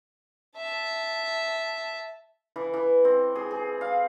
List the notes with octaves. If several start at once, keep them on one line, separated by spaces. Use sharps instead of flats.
E5 A5
E3
E3
C4
G#4
G#4
F5